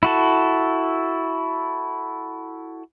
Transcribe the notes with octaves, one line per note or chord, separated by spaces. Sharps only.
E4 F#4 A4